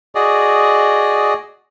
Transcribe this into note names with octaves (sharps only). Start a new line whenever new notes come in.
F#4 G#4 D5 D#5